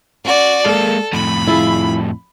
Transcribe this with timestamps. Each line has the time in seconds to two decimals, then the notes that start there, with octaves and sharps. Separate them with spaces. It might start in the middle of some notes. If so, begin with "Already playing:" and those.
0.25 C#4 F#4 D5
0.66 G#3 A#3 A4 F5
1.13 F2 A2 B5
1.48 E4 F4 G#4